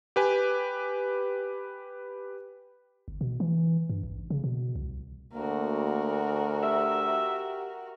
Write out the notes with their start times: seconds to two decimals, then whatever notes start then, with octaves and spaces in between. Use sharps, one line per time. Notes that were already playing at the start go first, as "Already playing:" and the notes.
0.16 G4 B4 G#5
3.08 G1
3.21 B2
3.40 E3
3.90 G2
4.03 A1
4.30 C#3
4.44 B2
4.76 C2
5.34 D2 A#3 F#4 A#4
6.62 G4 E5